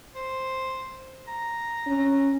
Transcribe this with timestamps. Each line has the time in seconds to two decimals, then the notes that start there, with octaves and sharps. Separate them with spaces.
0.15 C5
1.27 A#5
1.87 C#4